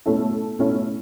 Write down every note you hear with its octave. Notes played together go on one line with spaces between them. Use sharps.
B2 A3 C#4 E4 A4
B2 A3 C#4 E4